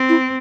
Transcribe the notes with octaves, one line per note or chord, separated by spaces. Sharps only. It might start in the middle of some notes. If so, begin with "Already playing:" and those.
Already playing: C4
E4